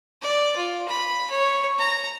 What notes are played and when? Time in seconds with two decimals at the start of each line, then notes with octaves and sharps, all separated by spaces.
0.22 D5
0.57 F4
0.88 B5
1.30 C#5
1.78 A#5